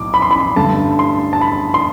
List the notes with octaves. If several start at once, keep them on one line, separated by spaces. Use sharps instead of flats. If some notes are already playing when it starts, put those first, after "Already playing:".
Already playing: B1 A2 D6
B5
C6
B5
G2 D3 A3 A5
C6
A5
B5
C6